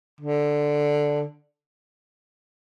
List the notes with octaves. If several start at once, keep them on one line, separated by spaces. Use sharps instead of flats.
D3